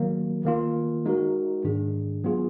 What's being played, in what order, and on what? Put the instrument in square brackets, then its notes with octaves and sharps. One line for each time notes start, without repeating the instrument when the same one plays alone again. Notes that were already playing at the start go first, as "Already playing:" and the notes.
Already playing: [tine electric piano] D#3 F#3 A#3
D#3 A#3 F4
G#3 D#4 F#4 A#4
G#2 D#3 G#3 D4 G#4
F#3 B3 F4 G#4